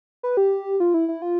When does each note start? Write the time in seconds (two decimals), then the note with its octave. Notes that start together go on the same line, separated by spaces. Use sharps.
0.23 B4
0.37 G4
0.80 F4
0.94 E4
1.09 E4
1.22 F4